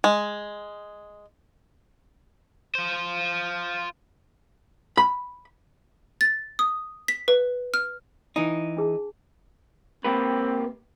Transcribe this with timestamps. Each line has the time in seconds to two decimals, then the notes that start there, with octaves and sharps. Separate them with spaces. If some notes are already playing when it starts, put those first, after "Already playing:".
0.04 G#3
2.75 F4 C5
4.97 B5
6.21 A6
6.59 D#6
7.08 B6
7.28 B4
7.74 F6
8.36 E3 D#4
8.77 D4 G#4 A5
10.05 A#3 C4 G4 B4